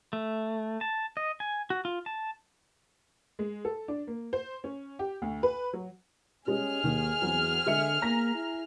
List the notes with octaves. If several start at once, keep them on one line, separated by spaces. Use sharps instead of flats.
A3
A5
D#5
G#5
F#4
F4
A5
G#3
A4
D4
A#3
C5
C#4
G4
D2
B4
F#3
G3 G#3 C#4 G#4 F6
D#2 D#3
E2 F#3 C4
D3 G#3 E5 C#7
A#3 A#5 A#6 B6
E4